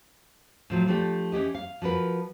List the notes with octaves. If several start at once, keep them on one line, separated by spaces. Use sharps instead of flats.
A2 F3 F#3
F3 A3 D4 G4
E3 C#4 G4 D#5
F5
F3 F#4 A#4 B4